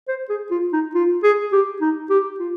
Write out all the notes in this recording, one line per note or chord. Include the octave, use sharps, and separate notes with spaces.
C5
G#4
F4
D#4
F4
G#4
G4
D#4
G4
F4